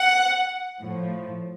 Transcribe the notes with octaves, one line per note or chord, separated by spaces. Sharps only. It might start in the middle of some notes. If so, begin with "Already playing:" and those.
Already playing: F#5
A2 F3